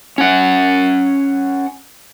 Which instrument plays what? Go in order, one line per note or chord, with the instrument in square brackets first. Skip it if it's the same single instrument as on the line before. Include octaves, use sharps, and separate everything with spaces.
[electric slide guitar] C#4 F#5